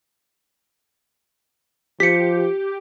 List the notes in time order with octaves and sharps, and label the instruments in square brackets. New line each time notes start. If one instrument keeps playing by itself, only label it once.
[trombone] F3 [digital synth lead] G4 [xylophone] B6 C#7